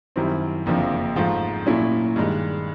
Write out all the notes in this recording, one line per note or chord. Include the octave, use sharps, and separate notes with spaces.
F#2 D#3 G3 C4 E4
F#1 F2 D3 F3 A#3
G#2 F3 A3
A#2 F#3 A3 C#4 E4
G2 D#3 G#3